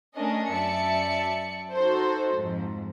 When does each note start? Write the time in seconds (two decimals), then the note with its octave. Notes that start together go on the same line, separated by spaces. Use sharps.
0.14 A3 C#4 D4 A#4 D#5
0.51 F#2 D5 E5 A5 C#7
1.74 D#4 F#4 A4 C5
2.35 F2 G#2